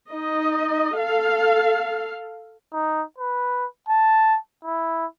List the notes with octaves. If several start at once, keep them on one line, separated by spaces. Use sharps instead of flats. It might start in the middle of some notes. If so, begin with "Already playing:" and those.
D#4 D#5
A4 F5
D#4
B4
A5
E4